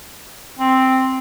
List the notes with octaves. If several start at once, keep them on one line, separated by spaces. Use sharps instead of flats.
C4